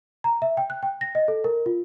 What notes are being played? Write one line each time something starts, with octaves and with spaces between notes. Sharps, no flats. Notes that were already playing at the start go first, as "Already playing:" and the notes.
A#5
E5
G5
F#6
G5
A#6
D#5
A4
A#4
F4